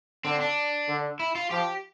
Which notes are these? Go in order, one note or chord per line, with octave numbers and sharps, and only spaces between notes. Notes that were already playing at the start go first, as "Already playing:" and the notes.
D3 C4
D4
D3
E4
F4
F3 G4